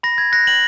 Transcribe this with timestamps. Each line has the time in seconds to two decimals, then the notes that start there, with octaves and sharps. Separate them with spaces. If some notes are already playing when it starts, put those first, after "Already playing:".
0.03 B5 A#6
0.18 G#6
0.32 F#6 A#6
0.47 F#7